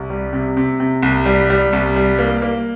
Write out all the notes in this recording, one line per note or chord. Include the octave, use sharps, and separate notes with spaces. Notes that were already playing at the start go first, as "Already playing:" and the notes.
Already playing: C2
G3
C3
C3
C3
C2
G3
G3
C2
G3
A#3
A#3